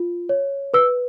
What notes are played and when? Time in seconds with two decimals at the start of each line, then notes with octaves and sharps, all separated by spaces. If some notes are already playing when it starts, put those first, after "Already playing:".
Already playing: F4
0.29 C#5
0.74 B4 E6